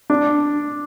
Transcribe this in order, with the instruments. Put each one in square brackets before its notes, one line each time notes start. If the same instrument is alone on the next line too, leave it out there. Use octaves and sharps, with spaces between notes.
[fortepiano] D4